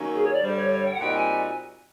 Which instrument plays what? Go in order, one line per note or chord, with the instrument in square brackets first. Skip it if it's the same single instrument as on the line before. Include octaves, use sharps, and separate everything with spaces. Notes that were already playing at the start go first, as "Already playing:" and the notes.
Already playing: [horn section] D#3 F#3 A#3 C#4
[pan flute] G#4
C#5
D5
[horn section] G2 D3 G3 [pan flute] C5
[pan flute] C#5
C#5
G5
F#5
[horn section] A#2 G3 C4 D#4 F#4 [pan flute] G5
[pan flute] G#5